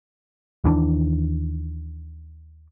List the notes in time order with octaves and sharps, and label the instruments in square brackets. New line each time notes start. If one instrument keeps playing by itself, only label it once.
[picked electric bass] D#2 D#3 E3 D4